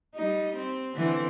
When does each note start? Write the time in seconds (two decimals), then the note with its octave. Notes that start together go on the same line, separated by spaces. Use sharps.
0.15 G3 D#4
0.57 C4
0.94 D3 E3 C4